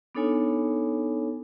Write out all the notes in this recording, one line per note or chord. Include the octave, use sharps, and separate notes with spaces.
B3 D4 D#4 A4 C#5 G#5